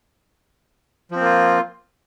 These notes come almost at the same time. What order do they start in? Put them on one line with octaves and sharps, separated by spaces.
F3 C4 A#3 F4